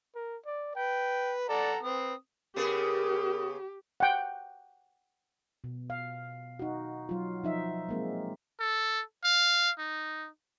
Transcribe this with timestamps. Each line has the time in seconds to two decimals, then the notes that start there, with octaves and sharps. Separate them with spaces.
0.15 A#4
0.46 D5
0.75 B4 G5
1.49 A4 D5 F#5 A#5
1.83 C4 B4 D#6
2.56 C#3 B3 G4 G#4 A#4
4.00 F#5 G5
5.64 B2
5.90 F5
6.59 D#4 F#4
7.09 F#3 F4
7.44 F3 D#4 E5
7.89 G#3 A#3 C4
8.60 A4
9.24 F5
9.79 D#4